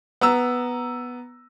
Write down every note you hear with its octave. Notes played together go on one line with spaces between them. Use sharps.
B3 A#5 E6